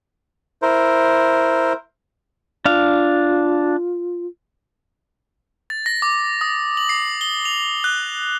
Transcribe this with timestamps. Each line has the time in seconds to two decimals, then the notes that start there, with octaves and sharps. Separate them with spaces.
0.62 E4 A#4 C5
2.65 D4 F4 F5
5.70 A6
5.86 A#6
6.02 D6
6.41 D#6
6.77 F#7
6.89 C7
7.21 G7
7.45 F7
7.84 F#6